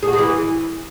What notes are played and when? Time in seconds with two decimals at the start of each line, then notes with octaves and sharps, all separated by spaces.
0.02 G#4
0.08 F#4
0.13 G#3
0.18 E3